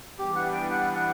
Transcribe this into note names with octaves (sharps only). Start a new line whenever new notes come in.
E3 G3 B3 D4 G4
F#5
G5
F#5
F#5